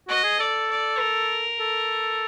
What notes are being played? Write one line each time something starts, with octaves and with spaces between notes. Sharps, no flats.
F#4 D#5
G#4
A4 D5
D5
A#4
A4